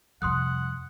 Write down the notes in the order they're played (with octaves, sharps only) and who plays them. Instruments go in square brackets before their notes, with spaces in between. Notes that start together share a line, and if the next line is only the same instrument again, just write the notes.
[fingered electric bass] F2 [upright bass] C3 G3 [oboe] F#5 [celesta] C6 D#6 F#6